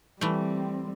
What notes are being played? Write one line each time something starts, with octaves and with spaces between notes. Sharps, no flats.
E3 G3 A3 C4